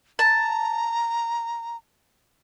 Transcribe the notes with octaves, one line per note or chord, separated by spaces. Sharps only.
A5 A#5